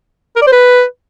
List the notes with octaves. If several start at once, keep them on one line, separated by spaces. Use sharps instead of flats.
A#4
D5
C5
B4